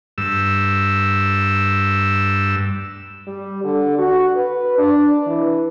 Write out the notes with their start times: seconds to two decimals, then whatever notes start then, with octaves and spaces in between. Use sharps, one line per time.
0.18 G2 E6
3.27 G3
3.64 D3
3.98 F#4
4.36 B4
4.78 D4
5.27 E3